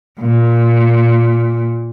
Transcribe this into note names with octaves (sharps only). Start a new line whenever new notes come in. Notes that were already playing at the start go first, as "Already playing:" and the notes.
A#2